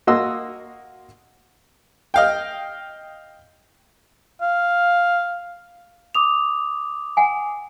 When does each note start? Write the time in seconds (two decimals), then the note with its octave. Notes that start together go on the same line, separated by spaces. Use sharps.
0.07 A#3 F#4 D#5 C6 E6
2.14 D#5 F5 G5
4.41 F5
6.15 D6 D#6 F7
7.17 F#5 G#5